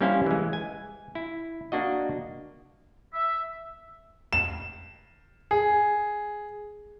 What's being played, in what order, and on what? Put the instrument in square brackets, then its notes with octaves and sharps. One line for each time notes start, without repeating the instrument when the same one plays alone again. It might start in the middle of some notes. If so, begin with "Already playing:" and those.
[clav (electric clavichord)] G3 A#3 C#4 E4 C5 F5
E3 G#3
G#5
E4
A#3 D4 F#4 D#5
[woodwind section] E5
[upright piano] E7
G#4